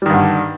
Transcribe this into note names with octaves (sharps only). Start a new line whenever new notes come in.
G2 D3 D#3 G3